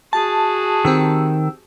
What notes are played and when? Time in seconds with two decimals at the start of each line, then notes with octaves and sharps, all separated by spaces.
0.13 F#4 G#4 A5
0.85 D#3 C4 G4 E6